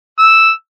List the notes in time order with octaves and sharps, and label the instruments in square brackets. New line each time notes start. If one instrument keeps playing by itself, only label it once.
[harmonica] E6